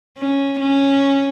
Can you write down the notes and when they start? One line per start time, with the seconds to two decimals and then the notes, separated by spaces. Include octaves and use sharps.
0.18 C#4
0.60 C#4